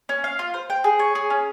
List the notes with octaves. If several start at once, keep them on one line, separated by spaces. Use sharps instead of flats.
C#4
F5
F4
C5
G5
G#4
C#5
G#4
C#4